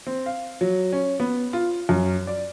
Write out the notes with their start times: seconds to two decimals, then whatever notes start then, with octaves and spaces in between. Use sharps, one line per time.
0.07 C4
0.26 F5
0.61 F#3
0.92 C#4
1.20 B3
1.53 F4
1.89 F#2
2.27 D5